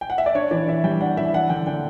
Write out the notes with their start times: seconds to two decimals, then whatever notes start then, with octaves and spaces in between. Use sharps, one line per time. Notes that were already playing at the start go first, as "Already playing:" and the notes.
0.01 G5
0.10 F#5
0.18 E5
0.26 D5
0.35 D4 C#5
0.51 E3 D5
0.68 E3 E5
0.84 G3 G5
1.01 D4 F#5
1.17 E3 E5
1.34 D4 F#5
1.50 D3 G5
1.66 D3 G5